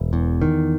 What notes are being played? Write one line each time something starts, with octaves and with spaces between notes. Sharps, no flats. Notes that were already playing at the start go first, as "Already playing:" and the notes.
Already playing: E1
E2
D#3